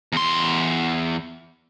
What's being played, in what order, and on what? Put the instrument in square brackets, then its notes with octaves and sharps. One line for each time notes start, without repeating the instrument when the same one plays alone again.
[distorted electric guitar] E2 C6